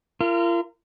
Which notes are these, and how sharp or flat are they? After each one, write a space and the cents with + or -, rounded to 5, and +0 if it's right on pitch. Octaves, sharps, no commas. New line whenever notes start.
F4 -40 A#4 -20